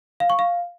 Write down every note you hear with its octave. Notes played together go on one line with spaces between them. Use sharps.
F5
C#6
F5